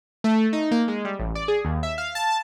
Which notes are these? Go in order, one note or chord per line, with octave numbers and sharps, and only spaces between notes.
A3
D#4
A#3
G#3
G3
A1
D5
G#4
D#2
E5
F5
A5